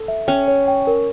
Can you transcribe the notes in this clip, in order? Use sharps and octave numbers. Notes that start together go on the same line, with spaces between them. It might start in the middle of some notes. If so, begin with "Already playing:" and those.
Already playing: A4
E5
C#4 G5
C#5
G5
A#4